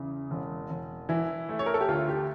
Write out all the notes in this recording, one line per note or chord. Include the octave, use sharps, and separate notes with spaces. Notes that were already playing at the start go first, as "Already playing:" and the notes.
Already playing: E2 C#3
E1
E1
E3 E4
A3
C#5
A#4
A4
G4
D2 F4
G4